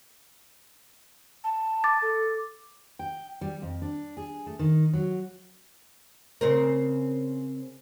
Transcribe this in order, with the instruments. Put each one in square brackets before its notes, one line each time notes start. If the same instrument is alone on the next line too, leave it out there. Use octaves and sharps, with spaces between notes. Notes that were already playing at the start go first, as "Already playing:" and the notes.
[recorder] A5
[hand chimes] D6 A6
[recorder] A4
[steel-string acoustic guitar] G5
G3
F2
D4
G#4
A3
D#3
F#3
[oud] C#3 C4 A#4